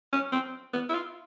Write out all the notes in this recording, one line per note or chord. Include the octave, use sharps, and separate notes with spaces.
C#4
C4
B3
E4
F4